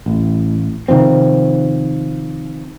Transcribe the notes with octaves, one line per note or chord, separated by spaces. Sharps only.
A1
C3 D#3 F3 C4